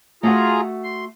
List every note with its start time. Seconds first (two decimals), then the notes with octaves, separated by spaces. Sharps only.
0.23 A3 F4 F#4 G#4 F#5 A#5
0.84 C6